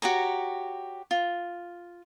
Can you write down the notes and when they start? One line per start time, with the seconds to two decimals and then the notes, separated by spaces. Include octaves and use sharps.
0.02 F#4 G4 C#5 A#5
1.11 F4